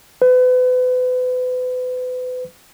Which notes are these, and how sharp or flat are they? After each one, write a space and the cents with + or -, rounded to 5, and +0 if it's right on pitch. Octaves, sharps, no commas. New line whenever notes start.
B4 +35